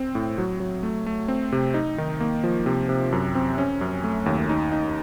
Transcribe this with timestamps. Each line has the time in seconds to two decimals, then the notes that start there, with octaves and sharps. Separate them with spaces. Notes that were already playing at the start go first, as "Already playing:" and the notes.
Already playing: C4
0.15 A2
0.38 F#3
0.60 F#3
0.83 A3
1.06 A3
1.28 C4
1.52 C3
1.74 D#4
1.98 D#3
2.20 A#3
2.44 F3
2.66 C3
2.89 C3
3.12 F#2
3.35 C4
3.58 C#4
3.81 F#2
4.04 A3
4.26 D#2
4.49 D#4
4.72 D#4